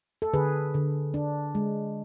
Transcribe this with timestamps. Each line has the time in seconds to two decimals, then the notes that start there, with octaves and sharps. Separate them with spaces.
0.22 A4
0.33 D3 G#4 B4
0.74 D3
1.14 D4
1.55 G#3